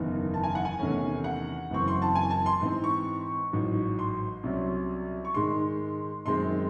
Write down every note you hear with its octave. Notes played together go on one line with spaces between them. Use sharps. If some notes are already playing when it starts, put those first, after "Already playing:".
Already playing: F#1 E2 D#3
A5
G#5
F#5
G#5
E2 C3 D#3 A3 C#4
F#5
F#1 F#2 E3 C4 C#6
C6
A5
G#5
A5
C6
G#2 E3 C4
C#6
A1 G#2 F#3
C6
C2 C3 F#3 C#4
C#6
G#2 D#3 G#3 C6
F#2 D#3 G#3 C4 C6